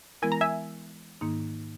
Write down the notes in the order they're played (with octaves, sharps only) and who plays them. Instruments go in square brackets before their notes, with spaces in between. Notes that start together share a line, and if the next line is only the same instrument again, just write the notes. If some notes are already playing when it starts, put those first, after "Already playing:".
[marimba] E3 G#3 B3 E4 A#4 [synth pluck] G#5
[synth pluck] A#5
E5 G#5
[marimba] G#2 D#3 A#3 D#4